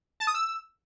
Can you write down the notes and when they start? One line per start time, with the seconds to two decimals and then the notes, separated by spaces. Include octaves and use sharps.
0.20 A5
0.27 D#6
0.34 E6